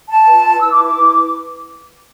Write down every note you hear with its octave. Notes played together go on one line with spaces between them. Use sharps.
A5
F4 B4
E4 B4 E6
D6
D6
E4 B4